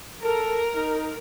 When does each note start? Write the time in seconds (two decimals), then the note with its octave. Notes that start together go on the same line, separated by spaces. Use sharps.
0.23 A4 A#4
0.75 D#4